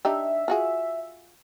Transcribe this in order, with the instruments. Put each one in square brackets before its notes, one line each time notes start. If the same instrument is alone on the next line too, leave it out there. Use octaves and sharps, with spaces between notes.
[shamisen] D4 D#4 G4 [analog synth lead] E5
[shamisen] F4 F#4 G#4